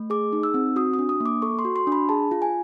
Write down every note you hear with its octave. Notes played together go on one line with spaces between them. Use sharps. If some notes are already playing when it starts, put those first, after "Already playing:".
Already playing: A3
G#4 D6
D#4
E6
C4
F#4 D#6
D#6
D4
D#6
A#3
D6
A4 C#6
C6
F#4
C6
D4
B5
G#4 A5
F4
G#5